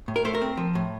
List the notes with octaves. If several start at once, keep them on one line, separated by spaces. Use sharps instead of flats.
A2
A#4
A3 C5
A#4
C4
F3
A2